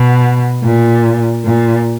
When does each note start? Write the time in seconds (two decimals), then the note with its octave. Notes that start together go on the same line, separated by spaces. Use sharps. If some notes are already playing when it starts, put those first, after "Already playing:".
Already playing: B2
0.64 A#2
1.45 A#2